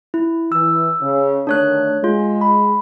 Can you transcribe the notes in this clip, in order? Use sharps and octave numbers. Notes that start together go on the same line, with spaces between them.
E4
E3 E6
C#3
D3 D#3 A3 D4 C#5 F#6
G#3 F4
B5